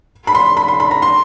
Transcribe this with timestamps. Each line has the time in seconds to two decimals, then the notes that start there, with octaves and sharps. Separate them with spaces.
0.27 B5
0.35 C6
0.57 B5
0.68 C6
0.80 B5
0.91 A#5
1.02 C6